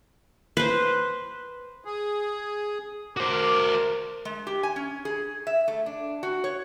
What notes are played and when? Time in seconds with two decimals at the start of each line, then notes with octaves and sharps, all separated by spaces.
0.57 B4 C5
1.85 G#4
3.17 F#4 A#4 C5 D6
4.25 G#3
4.47 G4
4.63 G#5
4.76 C#4
5.05 G#4
5.47 E5
5.68 A3
5.86 D4
6.23 F#4
6.44 C#5